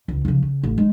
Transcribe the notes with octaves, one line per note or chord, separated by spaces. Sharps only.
C#2
C#3 F3
C#3
A1
G#3 D#4